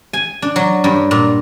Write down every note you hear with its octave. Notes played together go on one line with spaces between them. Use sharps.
G#5
D4
F#3
G2
A#2